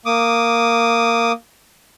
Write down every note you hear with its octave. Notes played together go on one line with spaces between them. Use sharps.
A#3 D6 D#6